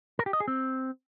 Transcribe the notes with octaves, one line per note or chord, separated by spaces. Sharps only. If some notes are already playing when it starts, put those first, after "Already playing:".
A#4
G4
D#5
G#4
C4